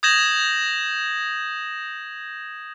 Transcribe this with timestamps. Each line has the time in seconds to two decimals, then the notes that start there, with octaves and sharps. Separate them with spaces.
0.03 D#6 G6 G#6 A#6 E7 F#7